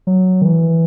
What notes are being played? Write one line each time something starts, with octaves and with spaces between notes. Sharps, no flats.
F#3
D#3
E3